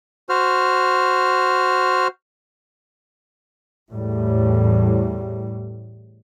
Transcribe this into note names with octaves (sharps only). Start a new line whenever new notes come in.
F#4 C5 F6
E2 A2 G3